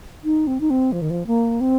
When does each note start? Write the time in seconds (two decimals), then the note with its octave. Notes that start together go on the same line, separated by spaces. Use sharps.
0.24 D#4
0.47 C4
0.60 D#4
0.70 C4
0.92 F3
1.02 D#3
1.10 F3
1.27 A#3
1.61 C4